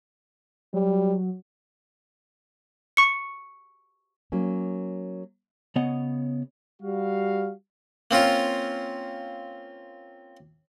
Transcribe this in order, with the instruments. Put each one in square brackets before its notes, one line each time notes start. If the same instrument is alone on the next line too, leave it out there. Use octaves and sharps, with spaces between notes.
[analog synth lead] F#3 [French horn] G3
[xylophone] C#6 C#7
[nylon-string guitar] F#3 A#3 C#4
[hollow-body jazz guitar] C#3 B3 C#5 D#5 F#5
[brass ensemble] G3 F#4 F5
[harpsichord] A#3 C4 C#4 F4